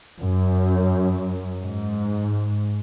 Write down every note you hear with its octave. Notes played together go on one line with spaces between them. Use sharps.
F#2
G#2